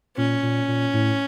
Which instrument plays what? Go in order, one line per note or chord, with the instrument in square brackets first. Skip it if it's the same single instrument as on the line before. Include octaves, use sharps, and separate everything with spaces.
[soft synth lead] A#2 [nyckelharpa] C#4
[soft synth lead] A#2
A#2
A2